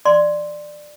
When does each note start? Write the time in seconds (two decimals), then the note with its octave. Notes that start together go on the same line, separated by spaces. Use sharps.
0.05 D5 C6